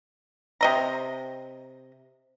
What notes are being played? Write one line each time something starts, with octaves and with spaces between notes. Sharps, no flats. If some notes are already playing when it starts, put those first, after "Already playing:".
C3 D#5 A#5